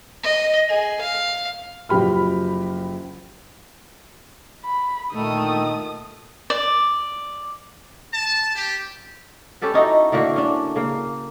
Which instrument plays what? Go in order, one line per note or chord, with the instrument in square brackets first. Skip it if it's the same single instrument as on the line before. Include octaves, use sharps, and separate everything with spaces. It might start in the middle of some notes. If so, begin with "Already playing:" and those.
[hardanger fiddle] D#5
G#4
F5
[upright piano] F#1 F3 F#3 G4 B5 F6
[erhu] B5
[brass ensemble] A#2 D3 D#3 [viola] A3 [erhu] D#6
[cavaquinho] D5
[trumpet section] A5
G4
[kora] C#4 G4 A4 B4
C#4 D#4 E4 F#4
A2 D3 A#3 F#4
C#4 D4
C#3 A#3